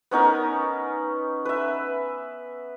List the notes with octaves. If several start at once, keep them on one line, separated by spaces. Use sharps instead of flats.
B3 C#4 D#4 A#4
B4 E5